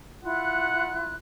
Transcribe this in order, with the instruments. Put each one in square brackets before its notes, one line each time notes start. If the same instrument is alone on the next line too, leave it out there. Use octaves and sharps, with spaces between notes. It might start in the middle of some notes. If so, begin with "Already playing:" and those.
[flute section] E4 F4 F#6 [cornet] F#5